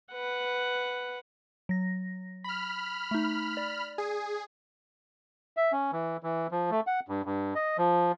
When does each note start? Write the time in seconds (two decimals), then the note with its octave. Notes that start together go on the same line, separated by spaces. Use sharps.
0.12 B4 F#5
1.69 F#3 A#6
2.44 B5 F6
3.11 A3 D#4
3.57 D5
3.98 G#4
5.57 E5
5.72 C#4
5.92 E3
6.23 E3
6.51 F3
6.71 A3
6.87 F#5
7.08 G2
7.25 G2
7.55 D#5
7.78 F3